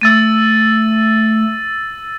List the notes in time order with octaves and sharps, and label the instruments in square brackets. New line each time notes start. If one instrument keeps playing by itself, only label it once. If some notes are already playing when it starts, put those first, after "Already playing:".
[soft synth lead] A3 [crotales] E6 A6 D#7